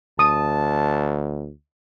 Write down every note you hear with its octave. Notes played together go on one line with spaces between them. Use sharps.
D2 A5 D#6